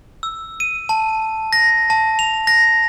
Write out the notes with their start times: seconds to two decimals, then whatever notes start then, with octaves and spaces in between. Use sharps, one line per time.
0.23 E6
0.60 D#7
0.89 A5
1.53 A#6
1.90 A5
2.19 F7
2.47 A#6